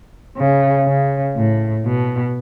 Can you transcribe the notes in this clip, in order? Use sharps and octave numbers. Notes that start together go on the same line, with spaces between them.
C#3
C#3
A2
B2